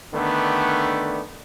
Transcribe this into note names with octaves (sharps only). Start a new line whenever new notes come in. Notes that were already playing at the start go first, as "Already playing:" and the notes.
D3 D#3 A3 B3 D4